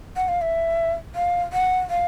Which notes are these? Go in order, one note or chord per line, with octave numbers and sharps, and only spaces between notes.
F#5
F5
E5
F5
F#5
F5